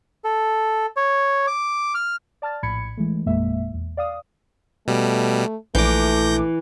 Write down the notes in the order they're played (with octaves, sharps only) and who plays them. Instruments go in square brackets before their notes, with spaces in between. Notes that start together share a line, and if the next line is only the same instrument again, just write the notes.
[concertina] A4
C#5
D6
F6
[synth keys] D5 A5 F6 A6
A#1 A2 B5 G#6 C#7
E3 G#3 A3
G#1 F2 A#2 G#3 A#3 E5
E2
D5 F5 D#6
[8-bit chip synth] B2 G3 [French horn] A3
[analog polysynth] A#1 D6 [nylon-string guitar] E3 [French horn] A3 [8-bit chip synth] G6 A#6